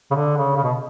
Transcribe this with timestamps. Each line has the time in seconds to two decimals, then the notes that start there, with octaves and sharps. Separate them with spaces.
0.11 C#3
0.15 D3
0.36 C#3
0.56 C#3
0.63 B2